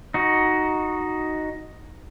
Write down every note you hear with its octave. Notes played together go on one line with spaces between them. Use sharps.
D#4 F#4